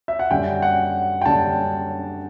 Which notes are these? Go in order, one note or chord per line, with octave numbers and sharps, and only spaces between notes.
E5
F#5
F#2 D3 G3 G5
F#5
G5
F#2 D3 G3 A5